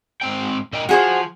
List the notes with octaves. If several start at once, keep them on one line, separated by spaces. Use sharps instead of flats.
G#2 C4 G5
A#2 D#5 G5
F3 F#4 G#4 C5